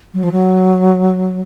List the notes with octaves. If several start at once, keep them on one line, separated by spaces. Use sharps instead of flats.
F#3
F3
F#3